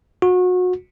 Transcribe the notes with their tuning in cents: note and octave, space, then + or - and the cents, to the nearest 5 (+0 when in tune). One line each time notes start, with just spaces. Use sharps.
F#4 -30